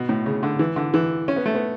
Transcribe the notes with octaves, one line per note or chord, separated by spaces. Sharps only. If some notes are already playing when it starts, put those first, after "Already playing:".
Already playing: B2
A2
C#3
D3
E3
D3
E3
C#4
B3
A3
B3